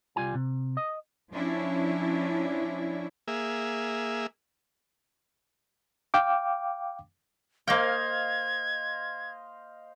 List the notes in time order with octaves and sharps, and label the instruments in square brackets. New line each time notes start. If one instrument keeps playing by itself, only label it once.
[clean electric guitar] C2 G3 F4 G#5
C3
D#5
[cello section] F3 C#4 D4 E4
[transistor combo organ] A#3 G#4 E5
[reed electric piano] F5 G5 D6
[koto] A#3 G5 [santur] C5 D#5 F5 [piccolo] G#6